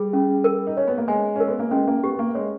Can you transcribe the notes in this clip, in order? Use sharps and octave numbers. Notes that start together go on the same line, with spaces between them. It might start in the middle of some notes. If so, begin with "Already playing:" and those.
Already playing: G3 G#4
C#4
A#4
D#4
C#4 C#5
B3
A#3
G#3 G#5
C#4 A#4
B3
A#3
G#3 C#4
A#3
B3 G4
B3
A#3
G#3 C#5